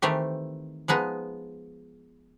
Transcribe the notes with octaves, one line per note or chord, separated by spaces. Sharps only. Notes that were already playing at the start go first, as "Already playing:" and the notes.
D#3 E3 A3 C4 G4
F3 G#3 B3 D#4